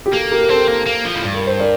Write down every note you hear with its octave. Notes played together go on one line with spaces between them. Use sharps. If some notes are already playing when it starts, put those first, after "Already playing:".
G4
A#3 A4
G4 A#4
A#4
C4 A4 C5
A#3
A#3
F3
A2
G2
A#4
C5
A#4 D5